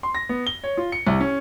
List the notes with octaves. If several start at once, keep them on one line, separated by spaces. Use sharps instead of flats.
C6
A#6
B3
G7
C#5
F4
C#7
C2
C#4